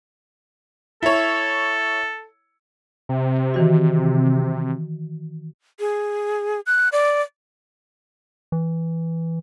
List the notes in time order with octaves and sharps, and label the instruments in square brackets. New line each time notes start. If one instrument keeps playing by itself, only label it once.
[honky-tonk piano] E4 C#5 [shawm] A4
[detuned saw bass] C3
[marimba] D#3 E3 F#4
[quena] G#4
F#6
D5
[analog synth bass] E3